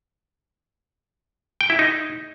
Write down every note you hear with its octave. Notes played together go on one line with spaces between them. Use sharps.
G5
E4
D#4